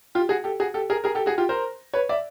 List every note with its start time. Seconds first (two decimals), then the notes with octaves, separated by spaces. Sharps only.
0.15 F4 G4
0.29 F#4 G#4
0.44 G4 A4
0.60 F#4 G#4
0.74 G4 A4
0.90 G#4 A#4
1.04 G#4 A#4
1.15 G4 A4
1.26 F#4 G#4
1.38 F4 G4
1.49 A#4 C5
1.93 B4 C#5
2.09 D5 E5